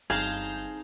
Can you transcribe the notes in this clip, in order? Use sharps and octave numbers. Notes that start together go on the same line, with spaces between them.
G1 C4 D#4 G#4 F5 A5 A#5 G6